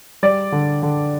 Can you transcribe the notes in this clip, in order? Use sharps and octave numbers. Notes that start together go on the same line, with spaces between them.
G3 D5
D3
D3